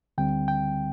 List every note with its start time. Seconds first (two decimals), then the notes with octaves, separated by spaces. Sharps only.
0.18 D2 D3 G3 C4 G5
0.48 G5